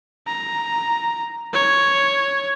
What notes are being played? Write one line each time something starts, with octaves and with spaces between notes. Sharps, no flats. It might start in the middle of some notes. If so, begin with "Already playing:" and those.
A#5
C#5